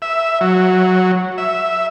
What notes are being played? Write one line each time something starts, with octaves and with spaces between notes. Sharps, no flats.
E5
F#3
E5